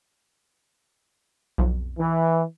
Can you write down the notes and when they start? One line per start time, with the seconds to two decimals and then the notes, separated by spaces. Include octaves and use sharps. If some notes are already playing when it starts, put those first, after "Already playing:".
1.58 B1 F2
1.98 E3